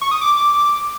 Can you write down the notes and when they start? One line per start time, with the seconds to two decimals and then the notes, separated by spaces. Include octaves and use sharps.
0.01 C#6
0.11 D#6
0.21 D6